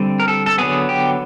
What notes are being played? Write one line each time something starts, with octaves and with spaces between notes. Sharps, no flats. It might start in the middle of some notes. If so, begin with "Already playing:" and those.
Already playing: D3 G3 C4
A#4
A4
A4
D3 F#3 B3 G#4
G4